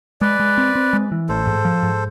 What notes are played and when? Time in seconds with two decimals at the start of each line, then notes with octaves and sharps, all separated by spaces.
0.21 G#3 B4 D5
0.40 G#3
0.58 C4
0.75 C4
0.93 G#3
1.12 E3
1.29 A1 A4 C5
1.47 G#2
1.65 F3
1.83 G#2